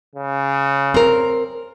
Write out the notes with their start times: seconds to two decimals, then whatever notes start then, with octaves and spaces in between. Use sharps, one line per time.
0.16 C#3
0.94 C4 A#4